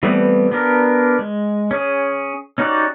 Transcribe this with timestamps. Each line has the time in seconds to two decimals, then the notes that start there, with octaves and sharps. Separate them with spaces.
0.03 E3 G3 A3 B3 C4
0.52 B3 D4 G4 A#4
1.19 G#3
1.71 C#4 G#4
2.58 C#4 D#4 F#4 G4 D5